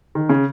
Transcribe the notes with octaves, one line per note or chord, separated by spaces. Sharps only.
D#3
C#3